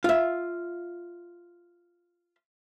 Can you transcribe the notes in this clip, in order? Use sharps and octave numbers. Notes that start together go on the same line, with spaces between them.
F4 E5